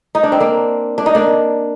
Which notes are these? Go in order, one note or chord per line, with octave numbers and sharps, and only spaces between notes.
D#4
D4
C4
A#3 D4
D4
D#4
A#3 D4